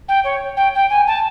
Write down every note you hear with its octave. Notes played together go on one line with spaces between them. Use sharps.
G5
C#5
G5
G5
G#5
A5